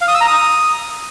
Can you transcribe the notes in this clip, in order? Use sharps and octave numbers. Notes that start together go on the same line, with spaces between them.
F5
D#6
E6
A#5
D#6